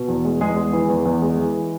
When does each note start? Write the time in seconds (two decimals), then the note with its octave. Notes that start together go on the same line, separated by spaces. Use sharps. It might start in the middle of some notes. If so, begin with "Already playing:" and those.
Already playing: B2
0.08 E2
0.25 G#3
0.41 E2 G#3 G#4
0.57 G#3
0.73 E3
0.89 E2
1.05 E2
1.22 G#3
1.38 E3